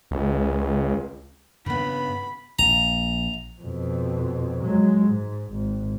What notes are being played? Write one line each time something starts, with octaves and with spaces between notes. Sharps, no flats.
C#2
G2 C#3 B3 B5
A#1 A#5
F2 B2
F#3 G#3
G#2
G#1